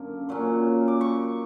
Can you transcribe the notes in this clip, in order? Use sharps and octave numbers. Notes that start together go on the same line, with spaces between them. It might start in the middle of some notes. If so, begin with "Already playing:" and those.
Already playing: F#2 D3 A#3 D4
A#2 F#3 C#4
D6
C#6